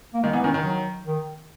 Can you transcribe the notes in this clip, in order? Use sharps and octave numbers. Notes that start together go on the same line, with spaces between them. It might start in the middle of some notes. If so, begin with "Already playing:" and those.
A#3
D#3 G#3
E3 B3
D#3 C#4
D#3
F#3
D#3